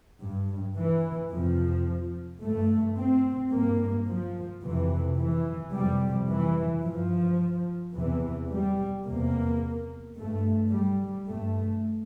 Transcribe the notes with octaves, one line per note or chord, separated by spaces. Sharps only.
G2
E3
F2 C3 F3
G2 A3
C4
G2 A#3
F3
F2 C3 E3
E3
F2 C3 G3
E3
G2 F3
E2 C3 E3
G3
E2 C3 A#3
G2 A3
G3
G2 A3